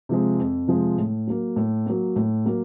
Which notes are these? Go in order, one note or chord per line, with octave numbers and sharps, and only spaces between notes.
C3 F3 G#3
F2
C3 F3 G#3
A2
F#3 A#3
A2
F#3 A#3
A2
F#3 A#3